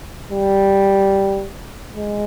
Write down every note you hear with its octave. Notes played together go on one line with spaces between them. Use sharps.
G3
G#3